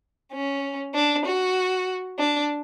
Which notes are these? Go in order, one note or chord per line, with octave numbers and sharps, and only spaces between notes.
C#4
D4
F#4
D4